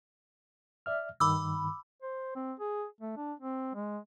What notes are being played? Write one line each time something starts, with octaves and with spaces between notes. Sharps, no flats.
D5 E5 F6
G2 D#3 B5 D6 E6
C5
C4
G#4
A3
D4
C4
G#3